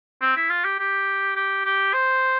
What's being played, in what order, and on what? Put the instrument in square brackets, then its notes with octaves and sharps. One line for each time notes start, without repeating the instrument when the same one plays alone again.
[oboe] C4
E4
F4
G4
G4
G4
G4
C5